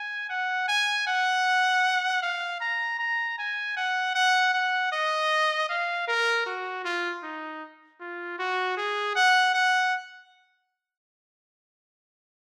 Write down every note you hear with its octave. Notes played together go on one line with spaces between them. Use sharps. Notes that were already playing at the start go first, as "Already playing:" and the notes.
Already playing: G#5
F#5
G#5
F#5
F5
A#5
A#5
G#5
F#5
F#5
F#5
D#5
F5
A#4
F#4
F4
D#4
F4
F#4
G#4
F#5
F#5